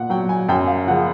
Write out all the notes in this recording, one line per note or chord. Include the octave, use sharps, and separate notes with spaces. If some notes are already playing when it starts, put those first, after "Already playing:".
Already playing: A#2 F#5
F#3 G5
G#5
F#2 G5
F5
C#3 F3 F#5